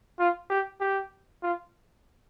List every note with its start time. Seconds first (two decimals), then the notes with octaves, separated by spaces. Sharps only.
0.20 F4
0.50 G4
0.81 G4
1.43 F4